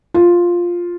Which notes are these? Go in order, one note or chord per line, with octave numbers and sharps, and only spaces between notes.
F4